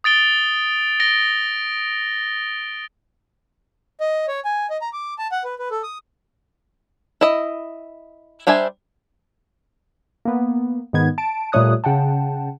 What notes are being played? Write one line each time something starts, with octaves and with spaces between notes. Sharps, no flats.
D#6 A6 D7 G7
A#6 D7 G7
D#5
C#5
G#5
D#5
A#5
D6
A5
F#5
B4
B4
A4
D#6
E4 D#5
G3 D4 C5 E5 G#5
A#3 B3
G#2 D#3 B3 G#6
A5 D7
A#2 G3 A3 C#5 D#6 F#6
C#3 F#5 G5 A5